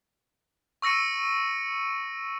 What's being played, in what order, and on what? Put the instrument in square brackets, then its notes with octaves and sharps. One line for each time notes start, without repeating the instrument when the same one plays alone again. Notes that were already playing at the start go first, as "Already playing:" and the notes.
[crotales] C#6 E6 A#6 C#7 D#7